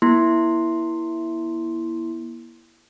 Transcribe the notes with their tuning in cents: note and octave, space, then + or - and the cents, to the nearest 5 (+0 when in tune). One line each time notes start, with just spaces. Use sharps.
A#3 +45 E4 +0 C6 +5